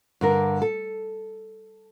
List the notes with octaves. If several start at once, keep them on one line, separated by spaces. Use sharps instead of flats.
G2 D3 A#4
A4